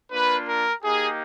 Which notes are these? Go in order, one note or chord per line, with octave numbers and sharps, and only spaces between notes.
A#3 D4 F4 B4
A#4
A#3 D#4 G4 G#4